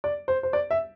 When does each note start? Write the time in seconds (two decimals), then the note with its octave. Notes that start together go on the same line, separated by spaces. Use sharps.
0.04 D5
0.28 C5
0.43 C5
0.53 D5
0.71 E5